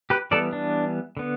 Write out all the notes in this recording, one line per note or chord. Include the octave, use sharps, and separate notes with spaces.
G4 B4
E3 G3 B3 A4 D5
D4
D3 B3